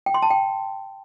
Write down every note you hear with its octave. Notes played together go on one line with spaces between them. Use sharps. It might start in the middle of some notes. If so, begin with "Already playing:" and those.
G5
C6
A5
G5